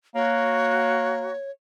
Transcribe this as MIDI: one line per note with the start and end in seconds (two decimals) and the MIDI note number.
0.15 1.35 58
0.15 1.31 66
0.15 1.51 73